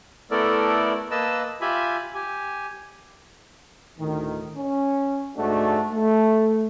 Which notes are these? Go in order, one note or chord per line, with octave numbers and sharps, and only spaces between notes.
A3 B3 E4 A4 A#4 D5
A#3 B4 D#5 A5 E6
F4 G4 E5 G#5 B5
G4 G#5
D2 A2 D#3
C#4
G#2 G#3 A3 D4 F#4
A3